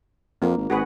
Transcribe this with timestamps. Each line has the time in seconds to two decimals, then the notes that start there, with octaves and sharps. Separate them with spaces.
0.42 F2 A#3
0.57 G#1
0.70 G#1 F#4 G#4 B4